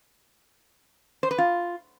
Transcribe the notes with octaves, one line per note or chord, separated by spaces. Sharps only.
C5
B4
F4